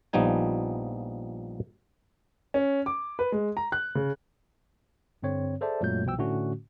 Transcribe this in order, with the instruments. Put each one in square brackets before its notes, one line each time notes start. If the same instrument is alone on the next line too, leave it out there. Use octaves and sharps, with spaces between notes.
[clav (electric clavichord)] A#1 F3 G3 B3 D#4 G#5
[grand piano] C#4
D6
B4
G#3
A#5
F#6
C#3
[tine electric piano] G2 D3 C4 C#5
G#4 A4 C5 D5 E5 A5
F#2 A#2 F#3 G#3 A3 G6
C2 B2 F3 G5 E6
A2 D3 A3 C#4 F#4